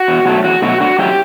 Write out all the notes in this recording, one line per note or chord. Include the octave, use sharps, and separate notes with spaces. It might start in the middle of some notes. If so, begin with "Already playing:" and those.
Already playing: F#4
E2
B2 F#3 A3
E2 F#4
B2 F#3 A3 F#4
D3 F#4
F#3 C#4 E4 G4